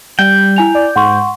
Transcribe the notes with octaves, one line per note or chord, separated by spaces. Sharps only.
G3 G5
E4 G#5 F7
D5
G#2 F#5 C6 C#6